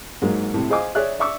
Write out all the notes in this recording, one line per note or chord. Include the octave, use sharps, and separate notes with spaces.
G#2 F#3 G#3 A#3
A2 C3
G#4 C5 D#5 F5 G#5 D6
G#4 C#5 D5 E5 F#6
D5 E5 C#6 D6 E6